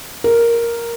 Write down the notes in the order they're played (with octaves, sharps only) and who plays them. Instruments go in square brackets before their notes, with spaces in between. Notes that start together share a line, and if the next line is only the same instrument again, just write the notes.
[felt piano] A#4